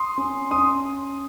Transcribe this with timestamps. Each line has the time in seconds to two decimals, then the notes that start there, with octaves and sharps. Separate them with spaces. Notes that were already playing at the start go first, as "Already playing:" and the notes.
Already playing: C6 D#6
0.18 C#4
0.51 C#4 C6 D#6